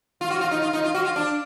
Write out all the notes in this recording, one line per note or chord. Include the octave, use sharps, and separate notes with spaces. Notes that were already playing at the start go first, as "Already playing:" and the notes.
F4
F#4
F4
D#4
F4
D#4
F4
F#4
F4
D4